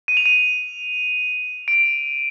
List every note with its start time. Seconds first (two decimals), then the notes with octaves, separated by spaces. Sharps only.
0.08 D#7
0.17 F7
0.26 D#7
1.68 D7